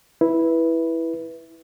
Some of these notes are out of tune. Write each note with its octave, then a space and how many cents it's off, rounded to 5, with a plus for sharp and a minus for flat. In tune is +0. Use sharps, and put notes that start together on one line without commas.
E4 +0 B4 -10